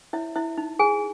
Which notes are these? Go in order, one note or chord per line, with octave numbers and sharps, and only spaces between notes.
E4 C#5 E5
E4 E5
D#4
G#4 G#5